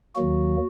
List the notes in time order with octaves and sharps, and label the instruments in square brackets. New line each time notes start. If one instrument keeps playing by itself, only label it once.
[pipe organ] D#2 D#3 F#3 A#3 F#4